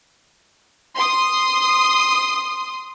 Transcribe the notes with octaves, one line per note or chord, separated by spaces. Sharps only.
C6 D#6